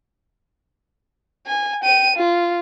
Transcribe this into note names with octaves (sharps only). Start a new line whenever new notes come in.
G#5
G5 D#7
F4